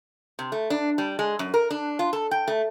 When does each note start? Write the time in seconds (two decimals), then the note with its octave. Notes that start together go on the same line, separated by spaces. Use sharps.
0.39 C3
0.52 A3
0.70 D4
0.98 G3
1.19 G#3
1.39 F#2
1.54 A#4
1.70 D4
1.99 F4
2.13 A4
2.31 G5
2.48 A3